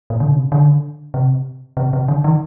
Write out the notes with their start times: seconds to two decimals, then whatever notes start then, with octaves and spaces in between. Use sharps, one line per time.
0.10 A#2
0.20 D3
0.31 C3
0.52 D3
1.14 C3
1.77 C3
1.93 C3
2.08 D3
2.24 D#3